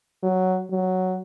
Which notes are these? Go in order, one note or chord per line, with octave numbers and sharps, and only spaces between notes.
F#3
F#3